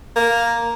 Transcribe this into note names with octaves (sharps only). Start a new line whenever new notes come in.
A#3